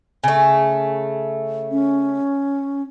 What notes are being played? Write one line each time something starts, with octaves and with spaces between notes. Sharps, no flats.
C#3 A3
C#4